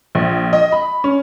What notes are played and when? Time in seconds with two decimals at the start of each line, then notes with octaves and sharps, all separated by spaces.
0.15 A#1
0.53 D#5
0.72 B5
1.04 C#4